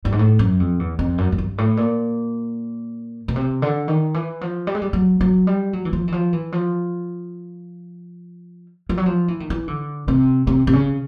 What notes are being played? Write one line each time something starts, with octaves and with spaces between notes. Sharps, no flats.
G2
G#2
A2
F#2
F2
E2
F2
F#2
F#2
G2
A2
A#2
B2
C3
D3
D#3
E3
F3
G3
G#3
G3
F#3
F#3
G3
F#3
E3
F3
E3
F3
E3
F3
F3
F#3
F3
E3
D#3
E3
D3
C3
C3
C3
C#3